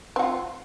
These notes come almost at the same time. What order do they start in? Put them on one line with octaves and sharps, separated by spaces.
C4 F#4 F4